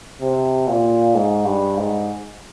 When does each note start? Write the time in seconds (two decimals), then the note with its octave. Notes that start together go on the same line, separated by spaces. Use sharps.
0.21 C3
0.68 A#2
1.15 G#2
1.45 G2
1.77 G#2